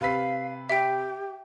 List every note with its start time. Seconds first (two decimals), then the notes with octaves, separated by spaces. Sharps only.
0.01 C3 B4 F5 B6
0.69 G4 E5 G5